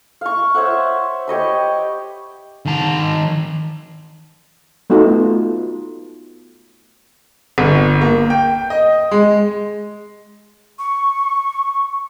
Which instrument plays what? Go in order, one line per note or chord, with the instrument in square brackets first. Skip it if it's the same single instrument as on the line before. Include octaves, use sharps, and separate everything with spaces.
[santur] F5 C#6
C5 C#5 E5 F#5
G4 C#5 D#5 B5
[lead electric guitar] D#3 A5
[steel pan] A3 B3 D#4 F4 F#4
[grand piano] G1
A#3
G5
D#5
G#3
[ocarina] C#6